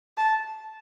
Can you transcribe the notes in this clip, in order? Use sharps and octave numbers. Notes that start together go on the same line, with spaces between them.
A5